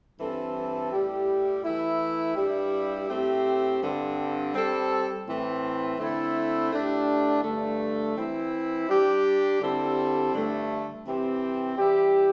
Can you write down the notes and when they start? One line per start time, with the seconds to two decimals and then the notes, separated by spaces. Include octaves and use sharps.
0.20 G2 E3 C4 A4
0.91 A2 G3 E4 G4
1.64 E3 A3 E4
2.36 G2 G3 E4 G4
3.09 A2 A3 C4 G4
3.81 G2 D3 C4
4.54 G3 C4 A4
5.26 A2 E3 C4
5.98 D3 A3 C4 E4 A4
6.71 A2 A3 D4 G4
7.43 G2 D3 A3
8.15 E3 C4 E4
8.88 G3 D4 G4
9.60 D3 G3 C4 E4 A4
10.33 G2 D3 A3
11.05 C3 E3 C4 G4
11.77 E3 G3 E4 G4